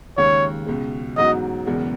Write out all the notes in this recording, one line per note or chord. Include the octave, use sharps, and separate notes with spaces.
D#2 C#3 G#3 C#5
C#2 B2 G#3
A1 G#2 F#3 B3 F#4 D#5
F#1 E2 B2 G#3 B3